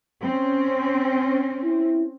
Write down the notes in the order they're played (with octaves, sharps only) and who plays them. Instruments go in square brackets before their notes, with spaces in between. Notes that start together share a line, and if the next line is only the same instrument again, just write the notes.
[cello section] C4 C#4
[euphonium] E4